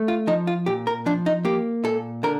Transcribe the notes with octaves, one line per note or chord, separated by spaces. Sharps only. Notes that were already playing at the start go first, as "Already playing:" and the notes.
Already playing: A3
F4
F3 D#4
F4
A#2 G4
A#4
F3 D4
D#4
A#3 G4
A#2 A4
D3 A#4